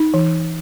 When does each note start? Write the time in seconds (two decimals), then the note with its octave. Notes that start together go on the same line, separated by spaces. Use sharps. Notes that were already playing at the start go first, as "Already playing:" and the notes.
Already playing: D#4
0.14 E3